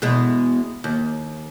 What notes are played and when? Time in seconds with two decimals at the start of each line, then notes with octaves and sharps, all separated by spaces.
0.02 E2 B2 G#3
0.84 D#2